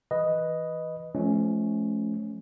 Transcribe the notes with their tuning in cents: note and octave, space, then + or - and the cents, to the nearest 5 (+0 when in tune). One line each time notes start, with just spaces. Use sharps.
E3 +0 B4 +0 D#5 +0
F3 -20 A3 -40 C#4 +0